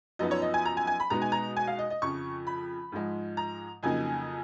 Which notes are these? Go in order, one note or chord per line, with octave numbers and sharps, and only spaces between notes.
F#2 F3 B3 D#4 D#5
C#5
D#5
G#5
A#5
G#5
G#5
B5
B2 G#3 B3 D#4 A#5
G#5
A#5
G#5
F5
D#5
D#5
F2 C#3 F3 C#6
B5
G#2 F3 G#3
A#5
F2 C#3 F#3 A#3 D#4 G#5